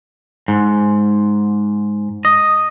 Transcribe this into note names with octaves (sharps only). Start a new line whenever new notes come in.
G#2
D#5